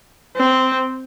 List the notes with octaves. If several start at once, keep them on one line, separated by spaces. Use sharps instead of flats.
C4